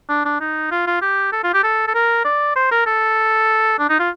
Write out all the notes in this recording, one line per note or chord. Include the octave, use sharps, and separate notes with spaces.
D4
D4
D#4
F4
F4
G4
A4
F4
G4
A4
A4
A#4
D5
C5
A#4
A4
D4
D#4
F4